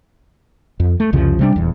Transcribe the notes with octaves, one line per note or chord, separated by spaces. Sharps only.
F2
A3
C2 F2 C#3 F3
C3 G3 D4
D#1 E2